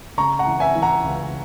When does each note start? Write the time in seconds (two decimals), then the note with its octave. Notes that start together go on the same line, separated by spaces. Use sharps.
0.18 C#3 A#5 C#6
0.39 F#5 A#5
0.47 E3
0.60 E5 G#5
0.75 E3
0.82 F#5 A#5
1.04 C#2